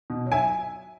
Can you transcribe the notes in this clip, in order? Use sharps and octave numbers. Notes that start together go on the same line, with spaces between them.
B2
F#3
E5 G#5